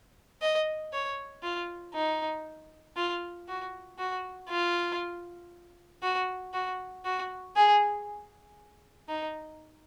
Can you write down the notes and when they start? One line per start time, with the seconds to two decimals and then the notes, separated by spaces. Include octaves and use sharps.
0.42 D#5
0.93 C#5
1.43 F4
1.94 D#4
2.96 F4
3.48 F#4
3.99 F#4
4.49 F4
6.02 F#4
6.53 F#4
7.05 F#4
7.56 G#4
9.09 D#4